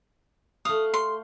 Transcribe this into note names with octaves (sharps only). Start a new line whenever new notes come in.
A3 F5 D#6
C6